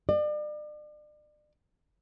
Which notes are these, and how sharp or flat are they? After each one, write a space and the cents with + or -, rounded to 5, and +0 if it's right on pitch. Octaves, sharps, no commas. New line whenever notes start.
D5 +40